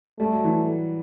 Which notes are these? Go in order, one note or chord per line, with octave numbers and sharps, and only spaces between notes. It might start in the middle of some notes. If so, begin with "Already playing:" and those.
G3 A3
F#3
E3